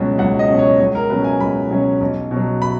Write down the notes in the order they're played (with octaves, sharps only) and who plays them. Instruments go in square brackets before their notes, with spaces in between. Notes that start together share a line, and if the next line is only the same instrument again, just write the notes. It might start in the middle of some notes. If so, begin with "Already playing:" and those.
Already playing: [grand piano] C#2 B2 F#3 C#4
C#2 F#5
D#5
B2 F#3 C#4
C#5
C#2 C#5
A#4
B2 F#3 C#4 B4
G#5
C#2 B5
B2 F#3 C#4
B1
B2
F#3
B5